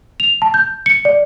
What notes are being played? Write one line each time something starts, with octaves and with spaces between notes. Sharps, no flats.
F7
A5
G6
C#7
D5